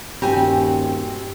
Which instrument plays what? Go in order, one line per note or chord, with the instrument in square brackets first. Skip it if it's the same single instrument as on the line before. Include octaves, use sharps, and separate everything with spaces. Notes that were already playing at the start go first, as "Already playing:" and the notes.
[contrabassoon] D#1 [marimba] G2 [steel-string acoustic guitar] C4 F#4 G#5 [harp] G4